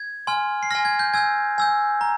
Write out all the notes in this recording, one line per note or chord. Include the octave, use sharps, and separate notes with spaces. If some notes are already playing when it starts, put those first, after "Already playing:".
Already playing: G#6
G#5 C6 F6
C7
G#5 C6 F6 A#6
G#6
G6
G#5 E6 G6 G#6
G#5 E6 G6
A#5